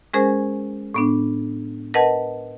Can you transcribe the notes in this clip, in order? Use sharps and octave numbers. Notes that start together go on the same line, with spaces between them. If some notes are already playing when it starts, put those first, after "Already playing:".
G#3 C#4 G#4 A#4 C5 G#5
A2 B3 D4
A#4 B4 D#5 F#5 A5